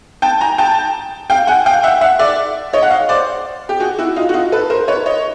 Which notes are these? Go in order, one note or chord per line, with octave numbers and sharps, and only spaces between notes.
G5 A5
G#5 A#5
G5 A5
F5 G5
F#5 G#5
F5 G5
E5 F#5
E5 F#5
D5 E5
C#5 D#5
F#5
D#5 F5
C5 D5
G4
F#4 G#4
E4 F#4
D#4 F4
F#4
D#4 F4
A4 B4
A#4 C5
B4 C#5
C#5 D#5